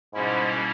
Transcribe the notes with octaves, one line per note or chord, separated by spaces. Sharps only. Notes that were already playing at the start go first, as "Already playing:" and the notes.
G#2 B2 G3 A#3 C#4 E4